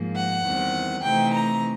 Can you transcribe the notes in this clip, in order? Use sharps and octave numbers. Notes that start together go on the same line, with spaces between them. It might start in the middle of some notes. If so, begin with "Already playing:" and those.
Already playing: G#2 F3 A#3
F#5
E2 C3 D#3 G3
C3 E3 A3 C4 D#4 G5
A#5